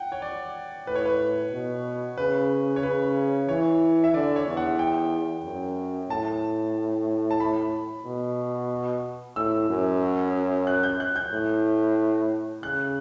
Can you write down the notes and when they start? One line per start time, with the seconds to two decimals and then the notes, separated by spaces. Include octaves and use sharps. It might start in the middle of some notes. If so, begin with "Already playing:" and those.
Already playing: F#5 G5
0.12 C#5
0.22 D5
0.87 A2 B4
0.95 C#5
1.05 B4
1.52 B2
2.18 C#3 B4
2.76 C#5
2.83 C#3 B4
3.48 E3 C#5
4.04 E5
4.14 D3 D5
4.36 C#5
4.47 E2
4.57 F#5
4.79 G5
5.44 F#2
6.10 A2 A5
7.31 A5
7.40 B5
8.06 B2
9.36 A2 E6
9.69 F#2
10.67 F#6
10.83 G6
11.00 F#6
11.16 G6
11.33 A2
12.63 C#3 F#6